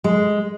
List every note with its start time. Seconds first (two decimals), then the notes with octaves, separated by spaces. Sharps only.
0.04 G#3